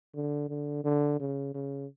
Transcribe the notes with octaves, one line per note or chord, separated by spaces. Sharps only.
D3
D3
D3
C#3
C#3